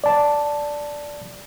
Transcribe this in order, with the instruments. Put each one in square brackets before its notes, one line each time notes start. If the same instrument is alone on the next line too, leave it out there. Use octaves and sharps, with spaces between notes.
[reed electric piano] D5 A5